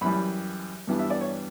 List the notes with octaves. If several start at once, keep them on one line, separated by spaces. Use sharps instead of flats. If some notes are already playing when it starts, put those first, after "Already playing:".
F#2 E3 G3 B5
G2 E3 G3 B3 D4
E5
D5
C#5